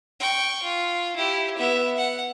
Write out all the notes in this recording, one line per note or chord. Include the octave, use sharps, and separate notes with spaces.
G5 C#6
F4
E4 G4
B3 E5
F#5